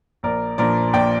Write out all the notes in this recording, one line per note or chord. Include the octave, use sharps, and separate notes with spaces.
A#1 A#4 D5
A#2 F3 D4 A#4 D5
A#1 D5 G5